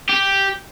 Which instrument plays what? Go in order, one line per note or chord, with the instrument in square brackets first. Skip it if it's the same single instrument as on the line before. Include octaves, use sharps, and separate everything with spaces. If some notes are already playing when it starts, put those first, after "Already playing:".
[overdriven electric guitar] G4